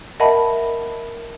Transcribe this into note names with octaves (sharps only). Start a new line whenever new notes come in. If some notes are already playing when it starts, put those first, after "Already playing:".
A#4 D#5 E5 F#5 A5 B5